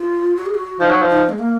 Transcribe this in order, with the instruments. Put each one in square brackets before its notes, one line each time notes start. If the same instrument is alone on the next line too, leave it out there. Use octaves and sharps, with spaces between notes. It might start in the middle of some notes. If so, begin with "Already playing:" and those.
Already playing: [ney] F4
F#4
G#4
F#4
[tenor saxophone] F3 [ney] D#4
[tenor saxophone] F#3
F3
[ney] D#4
G#3
A#3